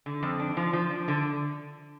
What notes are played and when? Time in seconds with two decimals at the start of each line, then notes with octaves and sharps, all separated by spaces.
0.06 D3
0.23 F2
0.40 D4
0.57 F3
0.73 F3
0.90 D4
1.08 D3